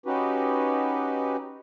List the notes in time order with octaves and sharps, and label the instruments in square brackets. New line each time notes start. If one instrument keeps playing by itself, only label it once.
[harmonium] C#4 D#4 F#4 G4 B4